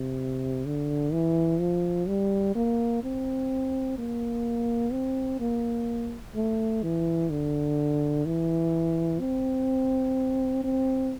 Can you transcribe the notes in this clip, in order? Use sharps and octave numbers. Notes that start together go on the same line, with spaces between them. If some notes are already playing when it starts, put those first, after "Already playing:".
Already playing: C3
D3
E3
F3
G3
A#3
C4
A#3
C4
A#3
A3
E3
D3
E3
C4
C4